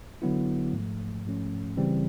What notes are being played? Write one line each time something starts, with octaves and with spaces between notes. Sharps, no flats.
D3 F#3 B3 E4
G#2 F3 A3
G#2 F3 A3 C#4
C#3 E3 G3 C4